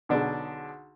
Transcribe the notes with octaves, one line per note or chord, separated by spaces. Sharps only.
B1 D3 D4 G#4